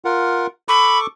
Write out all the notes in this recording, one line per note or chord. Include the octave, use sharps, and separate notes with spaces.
F4 A#4 F#5
A4 B5 C#6 D6